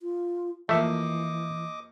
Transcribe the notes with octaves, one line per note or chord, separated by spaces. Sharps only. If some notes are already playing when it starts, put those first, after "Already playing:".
F4
F2 E3 A3 A#3 D#5 E5 D6